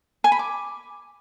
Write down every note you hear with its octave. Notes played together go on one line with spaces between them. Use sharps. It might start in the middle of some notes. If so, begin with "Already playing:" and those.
G#5
B5
D6